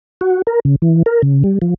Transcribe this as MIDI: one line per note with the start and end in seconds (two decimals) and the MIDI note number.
0.21 0.42 66
0.47 0.60 70
0.65 0.76 49
0.82 1.03 52
1.06 1.22 70
1.22 1.43 49
1.44 1.58 55
1.62 1.74 53